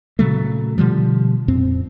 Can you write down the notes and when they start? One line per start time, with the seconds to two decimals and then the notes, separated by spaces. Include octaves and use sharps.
0.19 A#2 C#3 F#3 A3
0.78 B2 D3 F3 G3
1.48 F2 A#2 C4